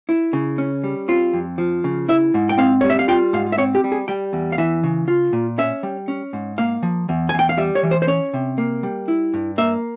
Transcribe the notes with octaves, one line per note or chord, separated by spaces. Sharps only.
E4
C#3
C#4
G3
C4 F4
F2
F3
C#3
E4 E5
G#2
G5
C4 F5
G3 C#5
E5
F5
F4 G5
G#2 F5
E5
C4 C#5
G4
G3
G#4
G3 G5
E2
F5
E3 E5
C#3
F4
A#2
C#4 E5
G3
C#4
G#2
A#3 F5
F3
E2
G#5
E2
G5
F5
G3 E5
C#5
E3
C5
C5
C#4 C#5
C3
A#3
G3
E4
G2
A#3 E5